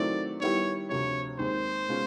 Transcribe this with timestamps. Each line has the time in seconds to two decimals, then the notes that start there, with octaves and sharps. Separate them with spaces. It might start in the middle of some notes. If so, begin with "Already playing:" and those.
Already playing: D#3 F#3 A3 C4 E4 D5
0.41 D#3 G3 B3 E4 G4 C#5
0.90 D2 C3 F3 C#5
1.39 D#2 D#3 G#3 C4 C5
1.88 B2 G#3 C#4 F4